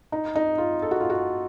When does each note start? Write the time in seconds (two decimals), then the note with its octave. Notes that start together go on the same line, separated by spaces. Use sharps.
0.12 D#4
0.35 D#4
0.58 F4
0.82 A4
0.91 F#4
1.00 F4
1.10 F#4